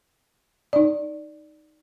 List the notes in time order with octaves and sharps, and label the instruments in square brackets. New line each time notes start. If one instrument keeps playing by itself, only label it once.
[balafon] D#4 D5